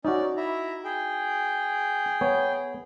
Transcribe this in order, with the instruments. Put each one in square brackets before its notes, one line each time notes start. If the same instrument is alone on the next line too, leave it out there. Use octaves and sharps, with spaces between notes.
[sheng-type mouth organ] C#4 D5 [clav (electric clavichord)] D#4 F#4
[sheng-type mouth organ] E4 E5 A#5
G#4 G5
[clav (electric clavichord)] B3 C#5